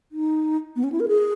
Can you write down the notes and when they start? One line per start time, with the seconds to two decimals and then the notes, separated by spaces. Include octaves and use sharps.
0.12 D#4
0.76 B3
0.84 C#4
0.92 E4
1.00 A#4
1.08 G#4